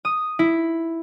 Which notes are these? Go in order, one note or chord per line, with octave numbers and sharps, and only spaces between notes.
D#6
E4